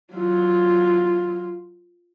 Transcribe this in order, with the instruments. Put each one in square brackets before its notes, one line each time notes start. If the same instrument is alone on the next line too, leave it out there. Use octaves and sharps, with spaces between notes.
[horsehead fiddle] F#3 F4